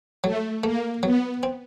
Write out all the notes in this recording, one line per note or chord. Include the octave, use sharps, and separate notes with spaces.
F#3 A3
A3 A#3
F#3 B3
C4